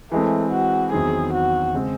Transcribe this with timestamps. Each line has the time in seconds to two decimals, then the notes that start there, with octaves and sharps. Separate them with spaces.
0.12 E3 G#3 A3 C4
0.52 F#4
0.92 E2 D#3 F#3 C4 G#4
1.33 F#4
1.74 C#3 G#3 C4